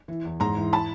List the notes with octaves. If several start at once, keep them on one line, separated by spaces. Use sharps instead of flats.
E3
E2
G#2 A#5 C6
E3
A5 B5